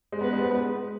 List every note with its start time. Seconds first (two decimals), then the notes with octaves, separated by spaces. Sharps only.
0.12 G#3
0.20 B3 B4
0.33 G#3
0.38 B3
0.51 B3
0.55 G#3